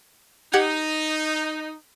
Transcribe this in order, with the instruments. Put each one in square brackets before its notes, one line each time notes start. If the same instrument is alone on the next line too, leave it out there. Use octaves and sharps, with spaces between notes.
[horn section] D#4 [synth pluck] G4 F#5 G#6